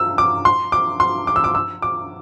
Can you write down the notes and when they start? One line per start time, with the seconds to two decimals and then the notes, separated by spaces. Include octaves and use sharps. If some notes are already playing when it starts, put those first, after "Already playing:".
Already playing: E6
0.18 D6
0.45 C6
0.72 D6
1.00 C6
1.27 D6
1.36 E6
1.44 D6
1.55 E6
1.82 D6